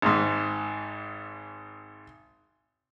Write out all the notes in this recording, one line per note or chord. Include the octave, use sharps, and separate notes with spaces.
G#1 G#2